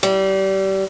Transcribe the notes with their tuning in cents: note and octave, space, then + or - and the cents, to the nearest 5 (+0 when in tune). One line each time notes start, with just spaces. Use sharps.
G3 -25